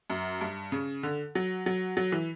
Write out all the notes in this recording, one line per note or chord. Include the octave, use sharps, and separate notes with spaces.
F#2
G2
C#3
D3
F#3
F#3
F#3
E3